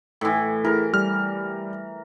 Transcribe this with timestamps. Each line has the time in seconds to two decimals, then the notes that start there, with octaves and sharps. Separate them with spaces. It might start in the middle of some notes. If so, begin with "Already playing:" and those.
0.21 A2 E3
0.64 E4 G#4 A#4
0.93 G3 F6